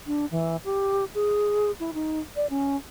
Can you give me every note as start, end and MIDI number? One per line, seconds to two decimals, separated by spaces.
0.07 0.26 62
0.31 0.56 52
0.65 1.05 67
1.15 1.71 68
1.80 1.91 64
1.94 2.20 63
2.36 2.47 74
2.50 2.77 61